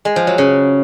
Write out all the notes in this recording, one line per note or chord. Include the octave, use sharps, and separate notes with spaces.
G#3
F3
F#3
C#3